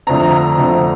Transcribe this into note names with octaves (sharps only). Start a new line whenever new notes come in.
F2 D3 A3 C4 A#5
F2 D3 A3 C4